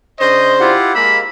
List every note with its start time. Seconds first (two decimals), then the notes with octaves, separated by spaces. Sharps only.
0.19 C#3 D4 C5 D#5
0.60 E4 F4 G4 F#5
0.95 G#3 A#3 B5 E6